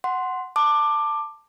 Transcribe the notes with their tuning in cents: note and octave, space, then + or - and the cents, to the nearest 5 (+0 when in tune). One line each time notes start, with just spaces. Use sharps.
F#5 +0 C6 +0
A5 +15 D6 +15